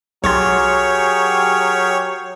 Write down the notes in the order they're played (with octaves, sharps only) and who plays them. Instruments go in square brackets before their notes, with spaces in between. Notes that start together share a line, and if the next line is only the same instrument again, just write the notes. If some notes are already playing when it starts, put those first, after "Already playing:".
[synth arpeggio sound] B1 C6 G#6 [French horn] F#3 [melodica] G4 G#4 A#4 [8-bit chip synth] C#5